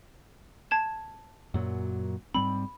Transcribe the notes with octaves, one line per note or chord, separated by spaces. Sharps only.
A5 G#6 E7
F#2 A#2 F#3
G#2 G3 C4 B5